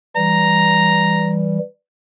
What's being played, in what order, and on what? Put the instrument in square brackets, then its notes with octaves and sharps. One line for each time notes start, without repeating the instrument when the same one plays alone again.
[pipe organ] E3 G3 [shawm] A#5